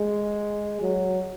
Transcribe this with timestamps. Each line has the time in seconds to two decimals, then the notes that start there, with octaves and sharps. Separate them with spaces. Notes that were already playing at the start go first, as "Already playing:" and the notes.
Already playing: G#3
0.81 F#3